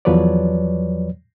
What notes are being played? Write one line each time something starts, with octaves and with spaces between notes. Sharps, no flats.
E2 F3 F#3 B4 C#5 D5